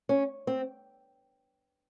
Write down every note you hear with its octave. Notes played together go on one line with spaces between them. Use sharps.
C#4
C4